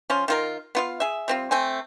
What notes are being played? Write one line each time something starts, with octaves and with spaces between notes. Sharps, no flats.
F3 C#4 F4
D#3 F4 A#4
B3 F4 F5
G#4 E5
G3 C4 F4
A3 C4 G#5